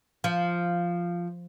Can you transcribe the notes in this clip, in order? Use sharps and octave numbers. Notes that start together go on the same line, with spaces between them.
F3